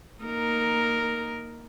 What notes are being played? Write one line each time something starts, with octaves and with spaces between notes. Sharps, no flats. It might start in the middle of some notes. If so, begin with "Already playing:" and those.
A#3 D#4 A#4